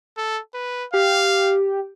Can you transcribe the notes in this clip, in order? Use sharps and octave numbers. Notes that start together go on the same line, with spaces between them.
A4
B4
G4 F5